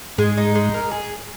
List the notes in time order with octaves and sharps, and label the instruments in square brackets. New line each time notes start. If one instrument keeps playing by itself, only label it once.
[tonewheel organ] G#2 [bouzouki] G#3
[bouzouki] D#4
G#3
A#4
G#4